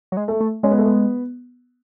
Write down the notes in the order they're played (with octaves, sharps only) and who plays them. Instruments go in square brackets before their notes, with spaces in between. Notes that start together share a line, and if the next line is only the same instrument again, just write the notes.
[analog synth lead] F#3
G#3
[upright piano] A3
[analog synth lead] A3
[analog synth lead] G#3 [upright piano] C#4
[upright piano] B3
A3
B3